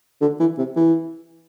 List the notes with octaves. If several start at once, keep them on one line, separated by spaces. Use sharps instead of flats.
D3
E3
C3
E3